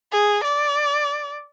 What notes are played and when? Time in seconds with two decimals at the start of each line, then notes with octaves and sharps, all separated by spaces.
0.12 G#4
0.44 D5